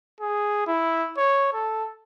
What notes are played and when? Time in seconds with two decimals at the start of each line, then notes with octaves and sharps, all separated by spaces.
0.21 G#4
0.67 E4
1.18 C#5
1.54 A4